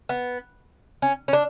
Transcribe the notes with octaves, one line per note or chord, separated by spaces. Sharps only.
B3
C#4
C#4
D4